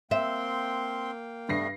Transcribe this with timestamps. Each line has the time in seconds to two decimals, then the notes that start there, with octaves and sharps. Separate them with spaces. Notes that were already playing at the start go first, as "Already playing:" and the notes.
0.11 A#3 C4 E5 F5 G5 C6
1.49 G2 G3 A3 B3 A#6 C7